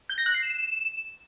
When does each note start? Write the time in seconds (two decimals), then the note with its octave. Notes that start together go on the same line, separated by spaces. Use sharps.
0.09 G6
0.18 A#6
0.26 F#6
0.34 C7
0.43 E7